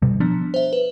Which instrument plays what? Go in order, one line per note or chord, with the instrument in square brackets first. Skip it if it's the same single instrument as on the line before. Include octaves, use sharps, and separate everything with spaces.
[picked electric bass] B2 G3
[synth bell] F3 B3 [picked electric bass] D4
[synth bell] C5 E5
B4